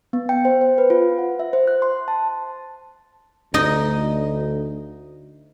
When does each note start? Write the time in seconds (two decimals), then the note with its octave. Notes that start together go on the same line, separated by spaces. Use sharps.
0.13 B3
0.29 G5
0.45 C5
0.61 C5
0.78 B4
0.90 F4
1.18 F#5
1.39 E5
1.53 C5
1.67 F#6
1.82 C6
2.08 A5
3.54 D2 D#4 D#5